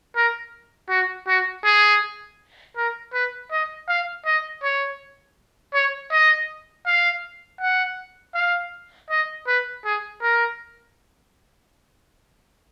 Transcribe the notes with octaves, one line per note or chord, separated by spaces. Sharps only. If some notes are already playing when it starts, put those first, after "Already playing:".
A#4
F#4
F#4
G#4
A#4
B4
D#5
F5
D#5
C#5
C#5
D#5
F5
F#5
F5
D#5
B4
G#4
A#4